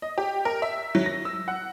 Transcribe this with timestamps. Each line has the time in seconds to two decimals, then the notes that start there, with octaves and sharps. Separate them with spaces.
0.02 D#5
0.18 G4
0.45 A#4
0.62 E5
0.95 F#3
1.06 A#6
1.25 E6
1.48 F#5